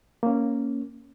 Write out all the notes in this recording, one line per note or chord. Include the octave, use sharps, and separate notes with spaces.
A#3 C#4